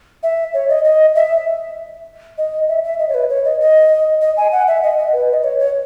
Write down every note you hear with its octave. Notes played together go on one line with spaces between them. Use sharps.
E5
C#5
D#5
D#5
E5
D#5
E5
E5
D#5
C#5
B4
C#5
D#5
D#5
D#5
G#5
F#5
E5
D#5
D#5
B4
D#5
C#5
C#5